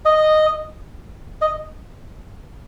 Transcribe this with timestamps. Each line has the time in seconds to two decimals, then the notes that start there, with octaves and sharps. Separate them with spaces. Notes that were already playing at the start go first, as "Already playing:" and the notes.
0.05 D#5
1.42 D#5